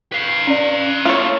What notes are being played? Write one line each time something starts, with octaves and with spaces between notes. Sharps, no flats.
B4 F5
C#4 D5
A#3 F4 A4 C#5